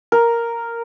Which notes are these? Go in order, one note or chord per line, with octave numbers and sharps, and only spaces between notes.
A#4